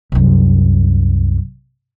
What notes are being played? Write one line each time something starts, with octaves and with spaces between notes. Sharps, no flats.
C2 F#2